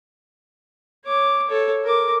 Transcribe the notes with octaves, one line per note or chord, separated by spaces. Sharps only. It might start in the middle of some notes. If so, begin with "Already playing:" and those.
C#5 D6
A4 C#5
A#4 D6